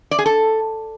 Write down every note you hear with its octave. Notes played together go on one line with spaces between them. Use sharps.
D5
G#4
A4